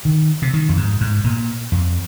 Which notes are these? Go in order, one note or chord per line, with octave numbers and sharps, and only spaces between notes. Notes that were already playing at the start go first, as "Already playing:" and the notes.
D#3
C3
D#3
F2
G#2
G#2
A#2
F2